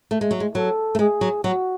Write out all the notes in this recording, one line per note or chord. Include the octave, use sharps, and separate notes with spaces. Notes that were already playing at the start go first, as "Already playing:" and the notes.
A3
G#3
F#3
G#3
F#3 A4
A3
G#3 G#4
F#3
F#3 F#4